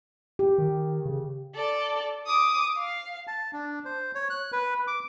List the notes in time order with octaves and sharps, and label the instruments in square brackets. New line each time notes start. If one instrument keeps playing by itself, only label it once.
[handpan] G4
[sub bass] D#3
C#3
[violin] A4 D5
D6 D#6
F5
[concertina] A5
D4
C5
C#5
F#6
B4
D6